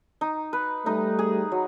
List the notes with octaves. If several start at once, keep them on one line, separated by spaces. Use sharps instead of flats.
D#4
B4
G3 A3 D#4
G#4
F#3